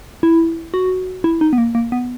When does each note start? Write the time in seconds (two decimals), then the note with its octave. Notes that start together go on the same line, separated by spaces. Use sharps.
0.23 E4
0.74 F#4
1.24 E4
1.41 D#4
1.53 B3
1.58 A#3
1.75 A#3
1.92 B3